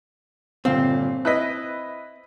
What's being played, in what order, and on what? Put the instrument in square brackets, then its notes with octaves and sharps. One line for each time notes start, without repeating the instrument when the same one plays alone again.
[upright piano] G1 A#2 F5 [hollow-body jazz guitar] C4
[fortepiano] E4 B4 D#5 [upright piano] F#6 B6